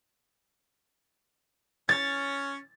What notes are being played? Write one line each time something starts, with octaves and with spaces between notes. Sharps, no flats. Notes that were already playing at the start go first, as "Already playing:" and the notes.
C#4 A6